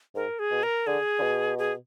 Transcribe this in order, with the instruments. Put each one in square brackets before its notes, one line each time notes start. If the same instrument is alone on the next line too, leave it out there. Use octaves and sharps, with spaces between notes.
[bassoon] G#2 [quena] A#4
[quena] G#4
[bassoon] B2
[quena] A#4
[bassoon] D3 [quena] G#4
[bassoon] D3
B2
[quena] G#4